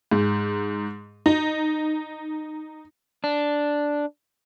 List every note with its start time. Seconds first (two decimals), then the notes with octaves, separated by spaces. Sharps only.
0.11 G#2
1.26 D#4
3.24 D4